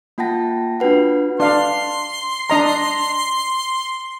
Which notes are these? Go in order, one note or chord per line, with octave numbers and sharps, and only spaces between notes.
A#3 F4 F#5 G5 A5 A#6
D4 F4 F#4 B4 F#5
D4 F5 C6
D4 D#5 A#5